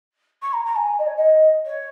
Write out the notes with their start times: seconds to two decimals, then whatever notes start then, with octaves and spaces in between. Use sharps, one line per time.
0.42 C#6
0.53 A#5
0.65 A#5
0.76 G#5
0.98 D#5
1.06 C#5
1.16 D#5
1.65 C#5